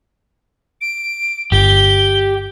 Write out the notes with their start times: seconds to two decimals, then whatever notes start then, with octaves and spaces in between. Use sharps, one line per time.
0.81 D7
1.52 G1 G4 G7